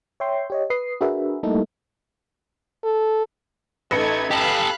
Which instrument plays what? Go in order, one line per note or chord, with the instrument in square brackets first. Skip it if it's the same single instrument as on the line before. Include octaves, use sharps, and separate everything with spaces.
[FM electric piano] C#5 E5 G5 C6
G4 C#5 D#5
B4 D#6 C7
D4 F#4 G#4 A#4 B4 E5
G3 A3 A#3 D#4 E4 A4
[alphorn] A4
[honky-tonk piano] A1 B4 C#7 [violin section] A3 D#4 G#6
[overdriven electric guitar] G4 A4 [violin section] F5 B5 F#6